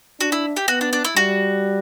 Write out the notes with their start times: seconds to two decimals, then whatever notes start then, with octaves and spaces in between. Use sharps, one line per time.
0.20 D4 F#4
0.32 E4
0.57 G4
0.68 B3 F#4
0.81 D4
0.93 D4
1.05 E4
1.16 G3 F#4